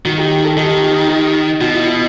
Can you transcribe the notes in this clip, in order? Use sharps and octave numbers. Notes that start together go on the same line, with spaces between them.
D#3 F#4
G4
A4
D#3 G4
G4
G4
G4
B2 F#4
E4
E4